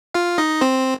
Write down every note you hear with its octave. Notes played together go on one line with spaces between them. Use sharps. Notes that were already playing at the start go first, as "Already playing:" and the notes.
F4 F5
D#4 D#5
C4 C5